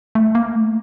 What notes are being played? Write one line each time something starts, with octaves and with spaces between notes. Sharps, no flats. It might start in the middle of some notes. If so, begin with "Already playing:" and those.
A3
A#3
A3